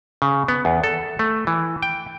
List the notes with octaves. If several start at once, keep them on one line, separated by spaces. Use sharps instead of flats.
C#3
B3
E2
A4
A3
E3
G5